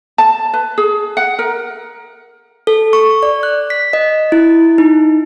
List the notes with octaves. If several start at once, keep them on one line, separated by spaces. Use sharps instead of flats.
A5
B4
G#4
F#5
A#4
A4
C#6
D5
F#6
B6
D#5
E4
D#4